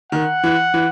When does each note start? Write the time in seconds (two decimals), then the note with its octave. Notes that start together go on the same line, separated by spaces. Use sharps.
0.12 D#3 F#5
0.43 E3
0.74 E3